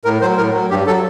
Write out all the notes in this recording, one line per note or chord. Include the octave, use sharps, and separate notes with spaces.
A2 A#4
F#3 C5
A2 A#4
F#3
G2 G4
F#3 A4